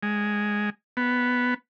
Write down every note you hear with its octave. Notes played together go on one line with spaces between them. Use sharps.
G#3
B3